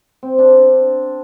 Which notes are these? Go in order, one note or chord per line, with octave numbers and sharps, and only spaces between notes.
C4
D4